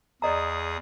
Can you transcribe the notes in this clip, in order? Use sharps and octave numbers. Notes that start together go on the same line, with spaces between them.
E2 G#4 D5 D#5 A#5 D#6